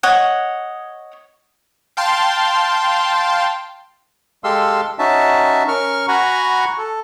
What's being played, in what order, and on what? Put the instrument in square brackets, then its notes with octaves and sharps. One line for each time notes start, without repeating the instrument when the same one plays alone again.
[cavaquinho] C#5 D#5 F#5
[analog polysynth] F5 G5 A5 C6
[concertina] G#3 G4 A4 F5 C6 E6
C#4 D#4 F#4 E5 A5
C#4 A#4 C#6 F6
F#4 F#5 G#5 A#5 B5 C#6
A4